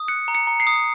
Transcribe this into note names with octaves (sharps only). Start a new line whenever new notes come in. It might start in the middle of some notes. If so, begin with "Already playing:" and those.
Already playing: D#6
F#6 C#7
A#5
C#7
A#5
C7
D#6